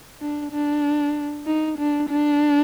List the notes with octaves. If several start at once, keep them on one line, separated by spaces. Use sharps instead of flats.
D4
D4
D#4
D4
D4